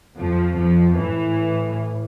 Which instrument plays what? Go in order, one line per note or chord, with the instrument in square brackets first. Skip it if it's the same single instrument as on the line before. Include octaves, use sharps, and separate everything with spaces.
[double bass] F2 [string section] F3
[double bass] F2 [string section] F3
[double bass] A2 [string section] E3